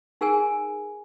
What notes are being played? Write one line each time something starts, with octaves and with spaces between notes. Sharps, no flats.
D#4 G#4 A#4 G#5